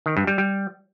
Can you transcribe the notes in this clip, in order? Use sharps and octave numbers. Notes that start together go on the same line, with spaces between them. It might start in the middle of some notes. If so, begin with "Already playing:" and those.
D#3
G2
G3
G3